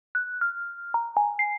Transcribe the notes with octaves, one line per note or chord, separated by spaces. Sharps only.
F#6
F6
A#5
G#5
C7